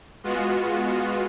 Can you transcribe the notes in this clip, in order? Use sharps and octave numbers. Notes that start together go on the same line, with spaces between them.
G#3 B3 F4 F#4